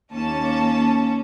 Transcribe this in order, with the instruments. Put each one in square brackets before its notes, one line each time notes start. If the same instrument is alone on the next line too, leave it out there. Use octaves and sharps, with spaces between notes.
[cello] D#2 A#3 [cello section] C#4 [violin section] A5